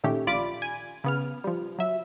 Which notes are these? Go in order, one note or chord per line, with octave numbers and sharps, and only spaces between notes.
A#2 D#3 A3 C#4 G4
A#1 F4 D5 B5 D6 D7
G#5
C#3 B3 F6
F3 G3
F#3 E5